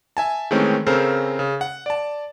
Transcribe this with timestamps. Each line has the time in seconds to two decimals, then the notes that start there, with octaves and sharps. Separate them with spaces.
0.17 E5 G#5 A5
0.51 D#3 E3 G#3 A3 C4 C#4
0.87 C#3 C4 C#4 A4 A#4 C5
1.39 C#3
1.61 F#5
1.86 D5 A5